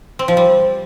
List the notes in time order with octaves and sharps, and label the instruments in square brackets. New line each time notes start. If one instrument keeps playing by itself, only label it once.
[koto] C4
F3
G3